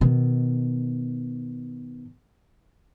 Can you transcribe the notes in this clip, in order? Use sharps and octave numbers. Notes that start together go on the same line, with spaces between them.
B2 D#3